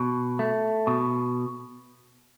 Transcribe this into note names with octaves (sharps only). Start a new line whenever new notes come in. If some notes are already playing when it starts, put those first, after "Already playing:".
Already playing: B2
A3
B2